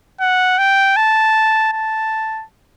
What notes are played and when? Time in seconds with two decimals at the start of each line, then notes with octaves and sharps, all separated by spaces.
0.20 F#5
0.58 G5
0.96 A5
1.72 A5